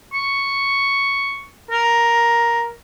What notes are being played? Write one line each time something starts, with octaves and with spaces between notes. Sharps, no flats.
C#6
A#4